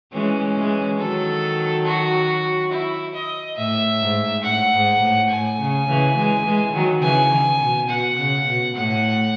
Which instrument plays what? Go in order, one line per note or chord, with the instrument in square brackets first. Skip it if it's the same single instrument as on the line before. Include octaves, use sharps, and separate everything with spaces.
[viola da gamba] E3 G#3 [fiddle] C#4
[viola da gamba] E3 G#3
[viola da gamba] D#3 F#3 [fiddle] A4
[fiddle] F#4
E4
D#5
[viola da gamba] A2 [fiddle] E5
[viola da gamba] G#2
[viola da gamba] A2 [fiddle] F#5
[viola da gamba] G#2
A2
[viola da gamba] A2 [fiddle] G#5
[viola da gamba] C#3
C#3 E3
E3 G#3
E3 G#3
D#3 F#3
[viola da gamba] C#3 E3 [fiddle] G#5
[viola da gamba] D#3
B2
[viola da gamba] B2 [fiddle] F#5
[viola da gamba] C#3
B2
[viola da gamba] A2 [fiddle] F#5